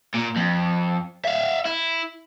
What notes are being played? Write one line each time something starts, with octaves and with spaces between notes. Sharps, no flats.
A#2
F2
E5 F5
E4